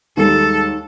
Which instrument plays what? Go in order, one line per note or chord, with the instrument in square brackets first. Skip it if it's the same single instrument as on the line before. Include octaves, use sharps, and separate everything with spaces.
[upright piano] D#2 G3 G#3 [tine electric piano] D#4 [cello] A4